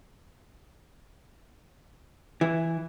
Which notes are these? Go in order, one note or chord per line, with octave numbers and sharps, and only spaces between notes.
E3